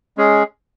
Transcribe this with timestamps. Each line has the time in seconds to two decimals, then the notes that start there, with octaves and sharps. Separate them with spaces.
0.17 G#3 C#4 G#4